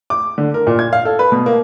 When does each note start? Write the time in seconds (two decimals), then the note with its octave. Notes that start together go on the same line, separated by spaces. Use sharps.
0.10 D6
0.38 D3
0.54 A#4
0.67 A#2
0.79 G#6
0.93 F5
1.05 A4
1.19 B4
1.32 B2
1.46 A#3